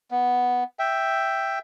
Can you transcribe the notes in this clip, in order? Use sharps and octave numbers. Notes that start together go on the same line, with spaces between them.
B3
E5 G5